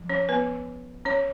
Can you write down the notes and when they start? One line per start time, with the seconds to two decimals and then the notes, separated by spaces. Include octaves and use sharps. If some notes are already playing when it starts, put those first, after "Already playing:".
Already playing: F3
0.09 C#4 C#5
0.29 B3 B4
1.05 C#4 C#5